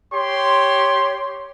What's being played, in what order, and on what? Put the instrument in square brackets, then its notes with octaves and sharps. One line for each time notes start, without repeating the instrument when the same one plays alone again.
[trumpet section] G4 C#5 C6